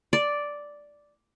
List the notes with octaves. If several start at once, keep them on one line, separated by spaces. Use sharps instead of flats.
D5